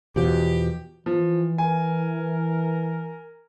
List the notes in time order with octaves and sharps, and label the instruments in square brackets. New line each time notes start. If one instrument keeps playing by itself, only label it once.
[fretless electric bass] E2 B2 F3 [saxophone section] G4
[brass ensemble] E3 [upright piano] F3
[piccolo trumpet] A#4 [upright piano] G#5